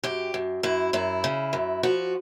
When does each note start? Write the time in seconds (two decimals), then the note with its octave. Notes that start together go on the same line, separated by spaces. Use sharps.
0.04 F#2 G4
0.34 F#2
0.63 F#2 E4
0.93 F#2 E4
1.24 C#3
1.53 F#2
1.83 F3 F#4